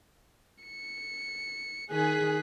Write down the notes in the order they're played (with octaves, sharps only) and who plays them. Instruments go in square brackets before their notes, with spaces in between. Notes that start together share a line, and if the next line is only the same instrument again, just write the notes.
[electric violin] C#7
[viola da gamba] D#3 [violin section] G#4 [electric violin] F#6 B6